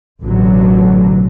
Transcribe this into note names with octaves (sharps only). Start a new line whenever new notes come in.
A1 B2 D3 F#3